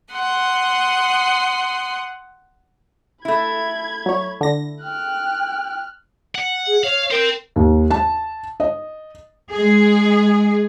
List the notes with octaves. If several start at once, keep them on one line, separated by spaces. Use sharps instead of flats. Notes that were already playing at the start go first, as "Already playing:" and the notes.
F#5 C6 D#6
A3 E4 B5 G#6
F#3 C#5
D3 A#6
G5 F6 F#6
F#5
G#4
C#5 F5
A#4 C5 G5
D#2
A5
D#5
G#3 G#4